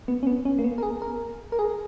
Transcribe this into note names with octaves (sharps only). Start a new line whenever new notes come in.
B3
C#4
B3
C#4
A#3
B3
A#4
G#4
A#4
A#4
G#4